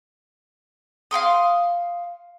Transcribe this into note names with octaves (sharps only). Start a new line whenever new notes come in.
F5 G5 C6 D#6